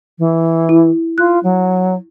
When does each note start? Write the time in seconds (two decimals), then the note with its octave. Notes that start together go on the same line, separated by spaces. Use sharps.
0.18 E3
0.69 E4
1.18 F4 F#6
1.43 F#3